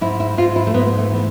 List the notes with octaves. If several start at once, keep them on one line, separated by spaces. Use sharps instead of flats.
G#2 E4
E4
G#2 F4
E4
A3
G#2 B3
A3
E3 B3